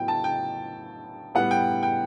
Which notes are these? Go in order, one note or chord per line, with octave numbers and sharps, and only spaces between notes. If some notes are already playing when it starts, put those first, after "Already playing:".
Already playing: A2 F#3 B3 G5
A5
G5
A2 G3 B3 F#5
G5
G5